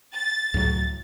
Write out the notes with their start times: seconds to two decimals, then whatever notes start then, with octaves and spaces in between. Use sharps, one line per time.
0.13 A6
0.54 C#2 A2 F#3